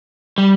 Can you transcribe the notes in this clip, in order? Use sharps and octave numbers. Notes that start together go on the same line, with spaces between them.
G3